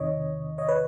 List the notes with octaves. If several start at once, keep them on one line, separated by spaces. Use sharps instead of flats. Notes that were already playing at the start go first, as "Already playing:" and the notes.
Already playing: E2 C3 D#3 C#5 D#5
C#5 D#5
B4 C#5